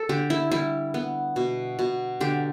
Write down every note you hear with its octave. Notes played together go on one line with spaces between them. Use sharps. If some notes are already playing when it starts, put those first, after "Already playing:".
Already playing: A4
D3 G4
E4
G3 E4
B3
B2
B2
D3 G4